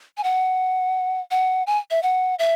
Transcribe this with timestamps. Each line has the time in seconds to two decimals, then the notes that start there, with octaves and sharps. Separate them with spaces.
0.17 G#5
0.24 F#5
1.31 F#5
1.67 G#5
1.91 E5
2.03 F#5
2.39 E5